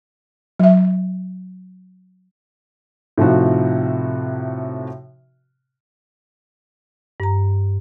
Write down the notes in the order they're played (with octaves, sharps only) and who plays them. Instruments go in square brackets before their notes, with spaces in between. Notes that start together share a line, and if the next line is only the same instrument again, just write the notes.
[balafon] F#3 E5
[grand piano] A2 C3 F3 D#4 F#4
[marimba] G2 A#5